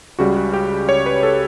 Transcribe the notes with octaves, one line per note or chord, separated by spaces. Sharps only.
C#2 C#3 G3 F#4
F#4
G4
C#5
B4
A4